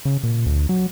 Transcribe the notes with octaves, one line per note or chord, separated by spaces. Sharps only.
C#3
A#2
D2
F#3